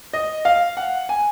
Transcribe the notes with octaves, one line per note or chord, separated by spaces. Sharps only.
D#5
F5
F#5
G#5